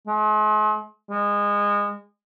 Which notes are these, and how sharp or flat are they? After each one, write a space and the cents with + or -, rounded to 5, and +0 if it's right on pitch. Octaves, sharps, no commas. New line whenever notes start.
G#3 +45
G#3 -25